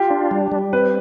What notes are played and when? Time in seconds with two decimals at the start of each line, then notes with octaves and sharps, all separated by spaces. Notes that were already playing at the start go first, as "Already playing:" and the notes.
Already playing: F4 G4
0.10 D4
0.31 G3
0.52 G3
0.73 C4 B4